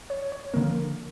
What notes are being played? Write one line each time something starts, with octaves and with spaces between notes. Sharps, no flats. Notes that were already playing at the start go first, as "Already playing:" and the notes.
C#5
C#5
D3 F3 A#3 A#4